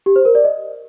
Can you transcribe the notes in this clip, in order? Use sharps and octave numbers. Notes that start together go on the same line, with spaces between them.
G4
C5
A#4
D5
D#5